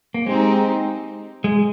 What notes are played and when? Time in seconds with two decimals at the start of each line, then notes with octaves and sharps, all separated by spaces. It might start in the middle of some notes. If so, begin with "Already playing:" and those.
0.14 A#3
0.26 G#3 C4 D#4 G4
1.44 G#3